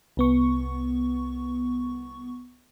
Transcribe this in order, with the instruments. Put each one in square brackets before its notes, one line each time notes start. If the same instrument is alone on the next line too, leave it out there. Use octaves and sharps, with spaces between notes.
[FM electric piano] C2 B3 C#6